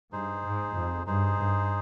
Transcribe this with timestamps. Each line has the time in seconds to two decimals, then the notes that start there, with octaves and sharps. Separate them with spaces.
0.12 G2 D#4 G#4 C5
0.44 G#2
0.75 F2
1.06 G2 D#4 G#4 C5
1.38 G2